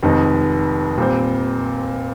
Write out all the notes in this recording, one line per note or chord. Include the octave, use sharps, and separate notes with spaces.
F1 F2 D#3 G#3 D#4
A#2 G3 C4